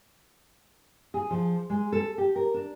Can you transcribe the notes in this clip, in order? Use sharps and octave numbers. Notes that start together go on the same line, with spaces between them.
G#4
F3
G#3
A4
G4
A#4
D4